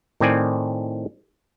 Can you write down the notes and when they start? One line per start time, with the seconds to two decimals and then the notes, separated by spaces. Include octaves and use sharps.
0.20 A2 D#3 C4 D5 G#5